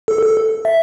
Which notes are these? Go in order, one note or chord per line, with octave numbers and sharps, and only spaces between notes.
A4
A4
E5